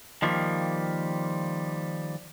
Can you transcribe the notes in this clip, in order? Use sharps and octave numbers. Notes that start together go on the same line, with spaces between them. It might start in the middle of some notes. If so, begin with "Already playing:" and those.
D#3 F3 G3 A#3